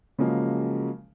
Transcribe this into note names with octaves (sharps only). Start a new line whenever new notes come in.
C#3 F3 F#3 G#3 A#3